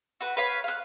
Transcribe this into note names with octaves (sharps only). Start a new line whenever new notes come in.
F#4 B4
B4 C#5 F5 B5
F5 F#6